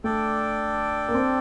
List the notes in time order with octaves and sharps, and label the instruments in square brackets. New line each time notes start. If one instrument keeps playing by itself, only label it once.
[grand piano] A3 [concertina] D4 A4 D5 G5
[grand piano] A#3
C4